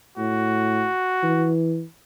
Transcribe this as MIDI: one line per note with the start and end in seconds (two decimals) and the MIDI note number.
0.17 0.86 45
0.17 1.52 66
1.23 1.83 52